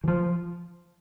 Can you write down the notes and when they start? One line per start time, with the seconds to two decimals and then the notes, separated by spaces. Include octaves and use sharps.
0.04 E3
0.08 F3